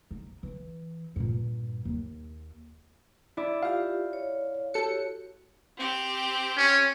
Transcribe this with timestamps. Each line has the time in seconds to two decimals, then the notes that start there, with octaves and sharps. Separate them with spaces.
0.11 D#4
0.43 E3
1.16 G2 A#2
1.85 D#2
3.37 E4 D5
3.63 F4 G4 F5
4.13 C#5
4.74 F#4 G4 A4 C#5 C#7
5.77 C4 G4
6.57 C#4